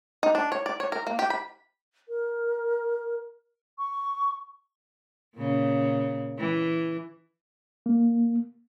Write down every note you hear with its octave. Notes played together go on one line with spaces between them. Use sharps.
D#4
D4
C#5
D5
C#5
A#4
A#3
G4
B5
A#4
C#6
A#2 C#3
E3
A#3